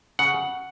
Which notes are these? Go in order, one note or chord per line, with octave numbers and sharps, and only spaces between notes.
C#3 F#5